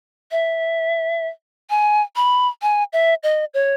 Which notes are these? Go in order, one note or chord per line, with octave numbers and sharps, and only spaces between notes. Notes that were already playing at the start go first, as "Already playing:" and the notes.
E5
G#5
B5
G#5
E5
D#5
C#5